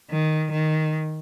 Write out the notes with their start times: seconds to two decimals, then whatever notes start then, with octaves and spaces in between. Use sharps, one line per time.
0.11 D#3
0.52 D#3